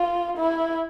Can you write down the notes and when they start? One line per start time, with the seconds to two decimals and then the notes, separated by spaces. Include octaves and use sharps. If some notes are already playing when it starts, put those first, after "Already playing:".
Already playing: F4
0.38 E4